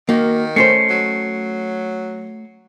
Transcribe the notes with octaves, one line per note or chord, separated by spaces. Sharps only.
D#3 A#3 F#4
A3 C#4 C5 C7 C#7
F#3